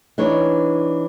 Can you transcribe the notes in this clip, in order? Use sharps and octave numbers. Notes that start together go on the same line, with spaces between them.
E3 D4 D#4 C#5